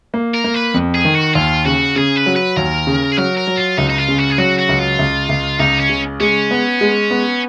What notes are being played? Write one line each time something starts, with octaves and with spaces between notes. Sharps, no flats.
A#3
A#4
A#3
B4
F2
G#4
D#3
F#4
D#2 F4
C#3 F#4
C#3 G#4
B4
F#3
B4
D#2 A#4
C#3
G#4
F#3 A#4
A#4
F#3
F4
C#2 D#4
D#4
F4
C#3
F#4
G#4
F#3 F#4
F#4
C#2
F4
C#2
C#2
C#2 D#4
C#4
C#3
G#3 C#4
B3
G#3
B3